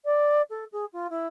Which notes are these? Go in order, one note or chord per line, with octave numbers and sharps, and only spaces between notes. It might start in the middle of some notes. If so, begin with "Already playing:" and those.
D5
A4
G#4
F4
E4